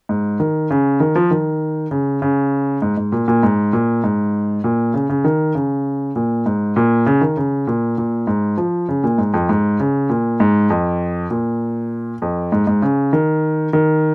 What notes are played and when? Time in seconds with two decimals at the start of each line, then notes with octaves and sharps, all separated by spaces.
0.09 G#2
0.40 D#3
0.70 C#3
1.00 D#3
1.15 F3
1.31 D#3
1.91 C#3
2.22 C#3
2.82 G#2
2.97 G#2
3.12 A#2
3.28 A#2
3.43 G#2
3.73 A#2
4.04 G#2
4.64 A#2
4.94 C#3
5.10 C#3
5.24 D#3
5.55 C#3
6.16 A#2
6.46 G#2
6.76 A#2
7.06 C#3
7.21 D#3
7.37 C#3
7.67 A#2
7.98 A#2
8.27 G#2
8.58 F3
8.88 C#3
9.04 A#2
9.18 G#2
9.34 F2
9.49 G#2
9.80 C#3
10.10 A#2
10.40 G#2
10.70 F2
11.31 A#2
12.22 F2
12.52 G#2
12.67 G#2
12.82 C#3
13.13 D#3
13.73 D#3